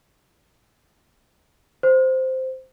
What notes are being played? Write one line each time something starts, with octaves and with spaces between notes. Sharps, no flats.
C5